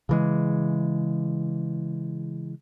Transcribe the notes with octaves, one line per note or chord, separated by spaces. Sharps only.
C#3 E3 G#3